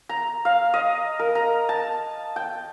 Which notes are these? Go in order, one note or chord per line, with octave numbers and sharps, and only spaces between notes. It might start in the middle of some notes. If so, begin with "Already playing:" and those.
A#5
F5
D#5
A#4
A#5
A5
G5